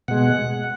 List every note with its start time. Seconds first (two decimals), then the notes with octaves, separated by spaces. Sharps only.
0.08 B2 G#3 F#5